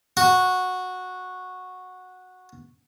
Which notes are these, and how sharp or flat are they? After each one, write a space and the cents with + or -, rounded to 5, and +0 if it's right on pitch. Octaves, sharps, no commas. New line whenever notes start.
F#4 -10